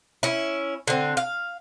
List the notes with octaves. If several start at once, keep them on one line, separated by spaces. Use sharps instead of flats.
C#4 E4
D3 C4
F5